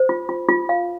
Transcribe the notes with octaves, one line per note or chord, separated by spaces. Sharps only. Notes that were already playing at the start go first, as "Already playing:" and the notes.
Already playing: C5
F4
F4
F4
F5